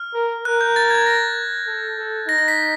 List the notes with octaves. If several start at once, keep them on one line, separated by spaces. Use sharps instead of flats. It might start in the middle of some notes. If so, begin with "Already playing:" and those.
Already playing: F6
A#4
A#4 F#6
G6
A6
G#6
A#6
A4
A4
D#4 A#6
A#6
B6